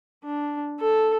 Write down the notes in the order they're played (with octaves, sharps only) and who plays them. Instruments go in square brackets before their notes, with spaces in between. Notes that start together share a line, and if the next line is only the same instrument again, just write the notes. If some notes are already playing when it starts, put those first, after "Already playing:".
[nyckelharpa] D4
A4